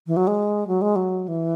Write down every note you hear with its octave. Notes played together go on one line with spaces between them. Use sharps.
E3
F#3
G#3
F#3
G#3
F#3
E3